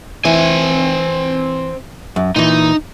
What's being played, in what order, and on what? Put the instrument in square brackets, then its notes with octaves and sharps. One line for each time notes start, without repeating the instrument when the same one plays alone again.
[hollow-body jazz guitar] E3 [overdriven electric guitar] C4 G#5
[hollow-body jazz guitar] F#2
[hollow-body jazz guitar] A#2 E3 [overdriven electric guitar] D#4